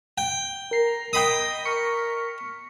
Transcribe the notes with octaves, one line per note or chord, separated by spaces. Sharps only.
G5
A#4 A#5 C7
D#5 G5 B5 D#6
A#4 C#6 B6 C#7